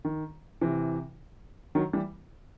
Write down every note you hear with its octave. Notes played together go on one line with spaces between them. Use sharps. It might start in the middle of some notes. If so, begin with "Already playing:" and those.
D#3
C3 E3
D#3 F#3
E3 G3